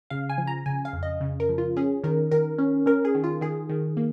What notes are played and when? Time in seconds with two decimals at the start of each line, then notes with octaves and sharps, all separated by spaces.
0.10 C#3 F5
0.29 G#5
0.38 F3
0.47 A#5
0.66 C#3 G#5
0.85 F5
0.93 F2
1.03 D#5
1.21 C#3
1.40 A#4
1.49 F3
1.58 F4
1.77 C#4 G#4
2.04 D#3 A#4
2.31 D#3 A#4
2.58 C#4
2.86 C#4 A#4
3.05 G#4
3.15 D#3
3.24 F4
3.41 D#3 G#4
3.69 D#3
3.97 A#3